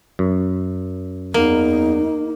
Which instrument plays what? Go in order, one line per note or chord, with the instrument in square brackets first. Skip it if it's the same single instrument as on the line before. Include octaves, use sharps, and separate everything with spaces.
[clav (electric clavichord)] F#2
[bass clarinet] E2 [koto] A#3 [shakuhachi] D#4